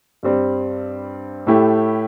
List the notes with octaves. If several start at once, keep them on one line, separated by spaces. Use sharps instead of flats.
G2 G3 C4
A2 A3 E4 G4